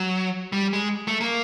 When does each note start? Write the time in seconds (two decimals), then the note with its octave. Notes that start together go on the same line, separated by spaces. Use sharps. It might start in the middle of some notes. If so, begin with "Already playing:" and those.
Already playing: F#3
0.52 G3
0.73 G#3
1.08 A3
1.21 A#3